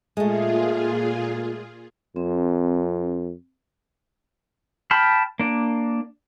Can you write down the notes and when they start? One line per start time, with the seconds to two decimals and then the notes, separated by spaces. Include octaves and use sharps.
0.17 A#2 G#3 A3 F4 G#4
2.16 F2 C4
4.91 G5 A5 B5 F6
5.39 A#3 D4